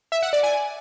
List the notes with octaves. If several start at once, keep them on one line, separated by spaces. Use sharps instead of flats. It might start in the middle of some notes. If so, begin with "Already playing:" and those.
E5
F#5
D5
G#5